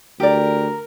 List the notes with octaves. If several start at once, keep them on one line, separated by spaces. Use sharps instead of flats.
D2 G4 A#4 D5 A#5